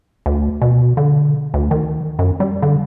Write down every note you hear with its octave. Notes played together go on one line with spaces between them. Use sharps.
D2
B2
D3
D2
D#3
F#2
G3
D3